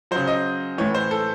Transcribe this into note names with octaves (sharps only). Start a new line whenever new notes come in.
C#3 F#3 C5
D#5
A2 E3 C#5
C5
A4